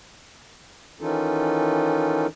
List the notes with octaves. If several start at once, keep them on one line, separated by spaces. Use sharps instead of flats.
D#3 E3 C#4 D#4 F4 A4